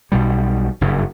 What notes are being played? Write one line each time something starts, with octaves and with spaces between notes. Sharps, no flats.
B1 B2 G3
F#1 G2 C#3